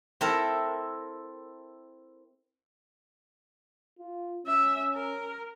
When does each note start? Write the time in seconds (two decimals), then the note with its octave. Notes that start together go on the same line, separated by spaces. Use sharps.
0.21 C4 E4 A4 A#4
3.99 F4
4.46 C#4 E5
4.94 A#4